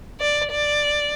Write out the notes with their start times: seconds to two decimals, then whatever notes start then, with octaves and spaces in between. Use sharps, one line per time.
0.20 D5
0.51 D5